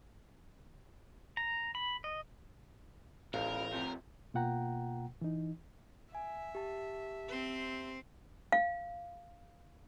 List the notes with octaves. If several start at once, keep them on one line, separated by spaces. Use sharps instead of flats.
A#5
B5
D#5
A1 G#2 C#3 A#4 F5
C3 F3
B2 A#3 F4 F#5 G5 A#5
E3 D#4
E5 G#5
G4 A5
C4 C5
F5